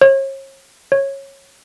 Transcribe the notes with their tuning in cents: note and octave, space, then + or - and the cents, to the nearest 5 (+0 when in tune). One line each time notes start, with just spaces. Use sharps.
C#5 -40
C#5 -15